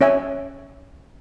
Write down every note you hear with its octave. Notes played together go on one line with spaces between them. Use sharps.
C#4 C#5 E5 G#5